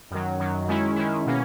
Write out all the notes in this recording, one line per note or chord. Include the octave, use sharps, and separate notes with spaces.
F#2 D#3 F#3
F#2 D#3 F#3
D#3 G#3 C#4 E4
D#3 G#3 C#4 E4
B2 A#3 C#4